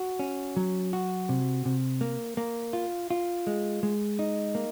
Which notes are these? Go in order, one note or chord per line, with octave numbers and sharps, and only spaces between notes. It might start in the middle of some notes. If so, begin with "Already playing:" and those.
Already playing: F#4
C#4
F#3
F#4
C3
C3
A#3
A#3
F4
F4
G#3
G#3
D#4
A#3